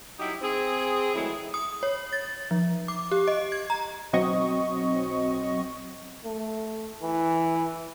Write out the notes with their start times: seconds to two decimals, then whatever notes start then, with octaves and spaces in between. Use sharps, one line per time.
0.19 F#3 D#4 E4 G4
0.42 C4 G#4
1.15 E3 F#3 G#3 A3 E4
1.54 D#6
1.83 C#5
2.13 A6
2.51 F3
2.88 D6
3.11 G4
3.28 D#5
3.52 G#6
3.70 A#5
4.13 B1 F#3 C4 D#5 C#6
6.26 A3
7.03 E3